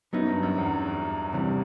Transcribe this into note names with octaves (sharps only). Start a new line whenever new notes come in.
F#2 F#3 B3 D#4
G2
F#2
E2
C3 E3 G3